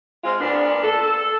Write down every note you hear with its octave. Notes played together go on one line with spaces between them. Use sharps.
G#3 C4 F4
A#2 B3 D4
A4